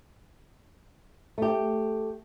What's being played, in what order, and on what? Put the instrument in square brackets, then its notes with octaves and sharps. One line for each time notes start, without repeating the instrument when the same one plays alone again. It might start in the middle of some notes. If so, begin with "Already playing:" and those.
[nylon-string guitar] A3 G4